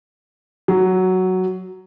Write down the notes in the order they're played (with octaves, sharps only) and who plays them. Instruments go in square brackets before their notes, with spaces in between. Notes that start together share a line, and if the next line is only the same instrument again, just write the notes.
[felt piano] F#3